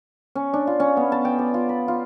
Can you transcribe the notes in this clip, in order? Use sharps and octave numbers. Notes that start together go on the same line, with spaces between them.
C#4
D4
F4
C#4
B3
A5
G5
D5
F4
B5
F4